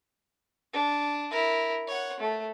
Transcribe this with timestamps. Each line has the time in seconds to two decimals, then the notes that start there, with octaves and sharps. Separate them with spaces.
0.74 D4
1.31 E4 A#4
1.88 C#5 F#5
2.20 A3